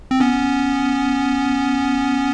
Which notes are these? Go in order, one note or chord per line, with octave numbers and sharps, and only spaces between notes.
C4
B3 C#4